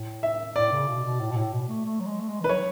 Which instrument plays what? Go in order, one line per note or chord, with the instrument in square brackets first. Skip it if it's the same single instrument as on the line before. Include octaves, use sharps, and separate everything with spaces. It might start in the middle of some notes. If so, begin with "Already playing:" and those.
Already playing: [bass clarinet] A2
[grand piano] E5
[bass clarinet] A2 [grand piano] D5
[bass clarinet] C#3
B2
B2
A2
B2
A2
B2
A3
A3
F#3
G#3
A3
G#3
E3
[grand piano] B4
[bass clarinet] F#3 [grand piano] C#5